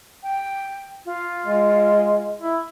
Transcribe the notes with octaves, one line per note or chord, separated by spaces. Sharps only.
G5
F4
G#3
E4